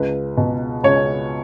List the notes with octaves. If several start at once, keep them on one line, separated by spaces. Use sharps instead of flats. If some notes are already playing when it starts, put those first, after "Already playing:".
Already playing: C#2 B4
B2
C#2 C#5